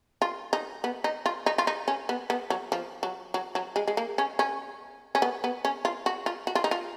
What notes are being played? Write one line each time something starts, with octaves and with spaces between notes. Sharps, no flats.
F4
D#4
B3
D#4
F4
D#4
F4
D#4
C#4
B3
B3
F#3
F3
F#3
F#3
F#3
G#3
G#3
A#3
C#4
C#4
C#4
B3
B3
C#4
F4
F#4
F4
F#4
F4
D#4
F4